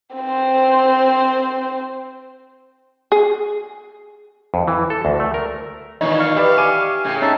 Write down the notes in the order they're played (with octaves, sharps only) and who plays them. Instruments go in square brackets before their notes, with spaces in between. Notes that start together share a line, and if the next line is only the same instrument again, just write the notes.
[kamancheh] C4 C5
[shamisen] G#4
[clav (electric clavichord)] F2
E3
A4
D2
A3
A#4
[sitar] A#2 E3 D#4 [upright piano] D#3 C#5
[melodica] F5 C#6
[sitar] G4 E5 [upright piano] B4 D5
[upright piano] G#5 D6 D#7
[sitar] A2 C#3 [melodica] G#5
[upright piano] C#4 D#4 A#5 [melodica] E5 A5